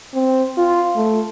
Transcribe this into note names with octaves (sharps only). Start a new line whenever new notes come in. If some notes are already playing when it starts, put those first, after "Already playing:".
C4
F4
A3